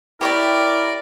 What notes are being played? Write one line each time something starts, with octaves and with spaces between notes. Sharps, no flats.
E4 G4 A#4 C#5 D5 G5